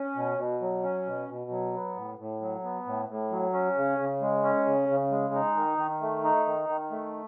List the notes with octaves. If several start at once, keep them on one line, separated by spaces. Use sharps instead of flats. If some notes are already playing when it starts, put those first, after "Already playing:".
Already playing: C#4
B2
B2
F#3
C#4
B2
B2
F#3
B3
A2
A2
F#3
B3
A2
A2
F#3
C#4
C#3
C#3
G#3
C#4
C#3
C#3
G#3
D#4
D#3
D#3
A3
D#4
D#3
D#3
A3